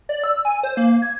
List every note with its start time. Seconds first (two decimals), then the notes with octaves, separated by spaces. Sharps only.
0.09 D5
0.24 E6
0.45 G#5
0.63 C5
0.77 A#3
1.02 G#6